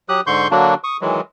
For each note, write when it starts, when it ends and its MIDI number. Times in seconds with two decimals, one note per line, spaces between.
0.09 0.21 54
0.09 0.21 67
0.09 0.21 87
0.09 0.21 90
0.27 0.48 44
0.27 0.48 50
0.27 0.48 84
0.27 0.48 85
0.27 0.48 91
0.51 0.74 50
0.51 0.74 54
0.51 0.74 58
0.51 0.74 62
0.51 0.74 66
0.84 0.97 85
0.84 0.97 87
1.01 1.21 51
1.01 1.21 52
1.01 1.21 54
1.01 1.21 56